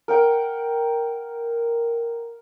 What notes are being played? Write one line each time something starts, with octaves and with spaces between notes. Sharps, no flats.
A#4 F#5 G5